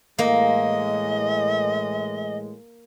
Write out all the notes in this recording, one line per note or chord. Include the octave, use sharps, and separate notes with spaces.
A2 E3 G#3 A#3 D#5